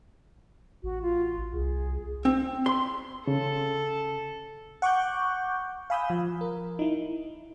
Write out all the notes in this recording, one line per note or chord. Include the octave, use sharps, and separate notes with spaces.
A1 F#4
F4
C2 G#4
C4
C6
C#3 A4
F#5 C#6 D6 F#6 G6
F5 G#5 B5 D#6 E6 G6
F3
A#4
D#4 E4